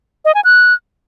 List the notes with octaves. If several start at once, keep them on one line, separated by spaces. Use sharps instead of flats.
D#5
G#5
F#6